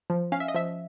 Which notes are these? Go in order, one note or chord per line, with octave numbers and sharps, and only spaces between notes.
F3
C#4 F5
E5
D#5
F3 E5